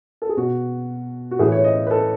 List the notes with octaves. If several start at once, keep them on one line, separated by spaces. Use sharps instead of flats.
A4
G#4
B2 F#4
F#4
A2 E3 G#4
C#5
D#5
B4
A4